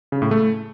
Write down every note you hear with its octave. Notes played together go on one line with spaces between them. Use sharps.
C#3
A2
A3